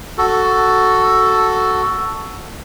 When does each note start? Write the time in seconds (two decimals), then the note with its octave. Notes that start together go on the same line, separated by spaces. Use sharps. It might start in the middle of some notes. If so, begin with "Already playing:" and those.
0.18 F#4 A4